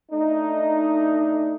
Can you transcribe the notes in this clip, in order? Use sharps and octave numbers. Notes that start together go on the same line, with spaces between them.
A3 D4 D#4